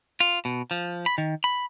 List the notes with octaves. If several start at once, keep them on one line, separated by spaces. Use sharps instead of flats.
F4
B2
F3
B5
D#3
B5